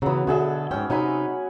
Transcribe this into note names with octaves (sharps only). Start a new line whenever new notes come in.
C#3 E3 F#3 B3
B2 D3 F#4 G#4 A4 E5
G#2 C#4 G5
C3 F#3 D#4 G#5 B5